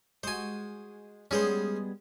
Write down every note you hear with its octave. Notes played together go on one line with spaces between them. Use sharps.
G#3 F#4 C5 G#5
G3 G#3 B3 C#4 G#4 C5